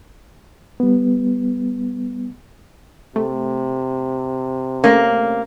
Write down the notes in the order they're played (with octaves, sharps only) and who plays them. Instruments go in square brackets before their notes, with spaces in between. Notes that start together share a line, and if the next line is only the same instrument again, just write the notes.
[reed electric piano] G3 B3
[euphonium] C3 [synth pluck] A3
[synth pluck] A3 C#4 [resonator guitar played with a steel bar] A#3